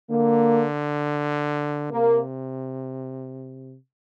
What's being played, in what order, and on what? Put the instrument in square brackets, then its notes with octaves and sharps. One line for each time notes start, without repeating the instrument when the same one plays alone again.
[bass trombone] D3 [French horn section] A#3
[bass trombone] C3 [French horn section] A#3